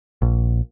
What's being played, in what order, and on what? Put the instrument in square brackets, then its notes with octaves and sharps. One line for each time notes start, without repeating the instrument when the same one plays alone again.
[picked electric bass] A#1